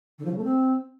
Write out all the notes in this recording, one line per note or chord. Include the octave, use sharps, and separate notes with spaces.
D3
F3
C#3
A3
C4